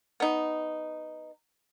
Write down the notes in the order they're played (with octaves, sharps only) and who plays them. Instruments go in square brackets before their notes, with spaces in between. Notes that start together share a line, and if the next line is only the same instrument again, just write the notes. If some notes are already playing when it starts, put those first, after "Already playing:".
[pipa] B3 D#4